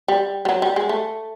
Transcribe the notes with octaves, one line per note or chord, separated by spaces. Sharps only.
G3
G3
F#3
G3
G#3
A3